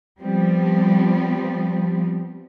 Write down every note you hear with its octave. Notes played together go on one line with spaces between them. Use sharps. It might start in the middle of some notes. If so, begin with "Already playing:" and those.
F3 G3 B3 C4